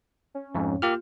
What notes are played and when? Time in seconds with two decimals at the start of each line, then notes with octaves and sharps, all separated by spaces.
0.34 C#4
0.55 F2 G#2
0.82 A#3 F4 G4 F6